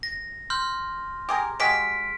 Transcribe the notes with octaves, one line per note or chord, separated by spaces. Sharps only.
A#6
C6 F6 G6
G4 G#4 A#4
G#3 F#4 G4 F6 B6 D7